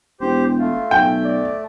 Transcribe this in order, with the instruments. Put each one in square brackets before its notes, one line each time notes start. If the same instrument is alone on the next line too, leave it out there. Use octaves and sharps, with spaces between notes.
[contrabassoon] E1 [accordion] G4 C5
[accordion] A3 [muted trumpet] F4
[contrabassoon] B1 [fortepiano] G5
[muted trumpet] D5